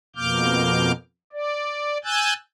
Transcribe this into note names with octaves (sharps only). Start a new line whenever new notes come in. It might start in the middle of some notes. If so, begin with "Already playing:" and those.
F2 B2 A#3 D6 F6 G6
D5
G#5 E6 F#6 G6 A6